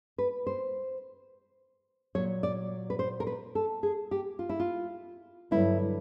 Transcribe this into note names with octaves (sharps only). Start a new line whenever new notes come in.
B4
C5
A#2 F#3 C#5
D5
B4
C5
A#4
B4
A4
G#4
G4
F4
E4
F4
G2 D3 F#3 E4